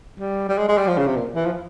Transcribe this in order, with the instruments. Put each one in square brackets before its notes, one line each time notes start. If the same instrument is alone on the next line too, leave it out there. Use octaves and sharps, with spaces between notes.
[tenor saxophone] G3
G3
G#3
G#3
G3
F3
C#3
C3
A#2
E3
F3